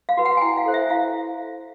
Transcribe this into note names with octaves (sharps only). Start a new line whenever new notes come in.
F5
F#4 B4
F#5
G#5
E4 G5
F5
A4 C5
E5
E4 F5